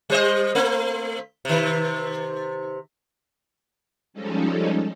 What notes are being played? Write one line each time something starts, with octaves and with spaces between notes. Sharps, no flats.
G3 C5 D#5
A3 C4
C3 D#3
F3 G3 G#3 C#4 D#4 A4